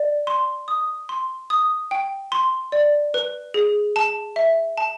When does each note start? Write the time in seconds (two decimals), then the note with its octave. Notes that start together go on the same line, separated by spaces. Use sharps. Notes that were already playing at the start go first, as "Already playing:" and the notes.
Already playing: D5
0.27 C6
0.68 D#6
1.09 C6
1.50 D#6
1.91 G5
2.32 C6
2.72 D5
3.14 B4
3.54 G#4
3.96 A5
4.36 E5
4.78 A5